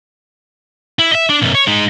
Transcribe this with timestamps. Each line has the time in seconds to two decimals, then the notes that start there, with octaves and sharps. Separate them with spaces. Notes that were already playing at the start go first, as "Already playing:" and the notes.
0.99 E4
1.11 D#5 E5
1.29 D4
1.42 B1 F#2
1.55 C#5
1.67 G#3 D#4